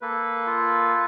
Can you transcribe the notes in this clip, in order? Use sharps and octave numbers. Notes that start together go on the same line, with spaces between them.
A#3 A4 B4
F4